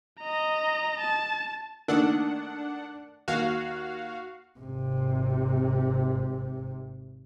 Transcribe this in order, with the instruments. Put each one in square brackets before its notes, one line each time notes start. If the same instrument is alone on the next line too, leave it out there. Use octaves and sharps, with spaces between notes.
[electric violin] D#5 A#5
A5
[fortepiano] D#3 A3 A#3 [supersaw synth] D4 F#5
[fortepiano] D#2 [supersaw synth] F#4 F5
[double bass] G#1 C3